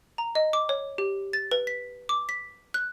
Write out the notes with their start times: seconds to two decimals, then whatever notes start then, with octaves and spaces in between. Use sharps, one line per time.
0.18 A#5
0.35 D#5
0.53 D6
0.69 C#5
0.98 G4
1.33 A6
1.51 B4
1.67 B6
2.09 D6
2.29 B6
2.74 F#6